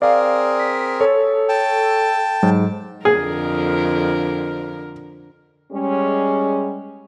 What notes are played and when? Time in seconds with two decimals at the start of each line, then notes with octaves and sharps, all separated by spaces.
0.02 C4 G#4 A#4 D5 F5
0.59 B6
1.01 A4 C#5
1.49 G5 A5
2.43 G#2 F#3
3.05 F2 D3 G#4 A#4
5.73 G3 G#3 C#4